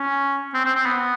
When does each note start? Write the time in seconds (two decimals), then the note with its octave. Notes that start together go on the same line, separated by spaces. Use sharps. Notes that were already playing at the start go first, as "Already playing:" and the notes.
Already playing: C#4
0.54 C4
0.65 C4
0.75 C4
0.86 B3